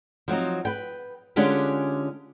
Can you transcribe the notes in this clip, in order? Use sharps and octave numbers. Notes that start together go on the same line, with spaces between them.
F3 F#3 C4 D#4
B4 G5
D3 G#3 C#4 D4 F4 G4